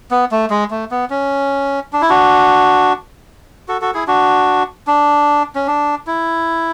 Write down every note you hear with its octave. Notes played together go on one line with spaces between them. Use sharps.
B3
A3
G#3
A3
B3
C#4
D4
E4
D4 F#4
F#4 A4
F#4 A4
E4 G#4
D4 F#4
D4
C#4
D4
E4